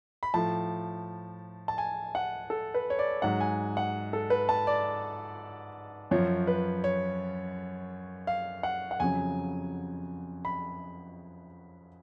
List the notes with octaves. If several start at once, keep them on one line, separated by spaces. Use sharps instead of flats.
B5
A2 F3 A5
A5
G#5
F#5
A4
B4
C#5
D5
G#2 F#3 F#5
G#5
F#5
A4
B4
A5
D5
F#2 F3 C#5
B4
C#5
F5
F#5
F#5
F2 C#3 F#3 G#5
B5